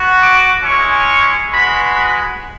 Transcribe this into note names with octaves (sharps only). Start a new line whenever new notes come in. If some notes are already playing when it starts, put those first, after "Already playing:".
Already playing: B3 F#4
D6
G#3 C#4 E4 C#6
G#3 B3 F#4 B5